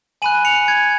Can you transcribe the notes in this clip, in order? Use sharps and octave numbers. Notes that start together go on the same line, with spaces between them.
G#5 B5 F#6 D#7 F#7
C#7 F7
G#6